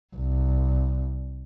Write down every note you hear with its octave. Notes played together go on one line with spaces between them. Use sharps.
C2